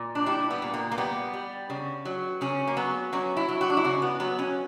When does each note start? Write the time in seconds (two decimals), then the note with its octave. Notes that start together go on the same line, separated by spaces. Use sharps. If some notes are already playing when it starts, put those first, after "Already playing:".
Already playing: A#2
0.15 D4
0.26 G3 E4
0.50 B3
0.62 A#2
0.74 A#3
0.91 A#3
0.98 G3 B3
1.33 G3
1.70 C#3
2.05 F#3
2.41 C#3 C#4
2.67 A#3
2.77 F#3 B3
3.13 F#3 C#4
3.37 E4
3.49 F#3
3.61 F#4
3.70 D4
3.77 E4
3.84 C#3 F#4
4.02 B3
4.20 F#3 B3
4.39 C#4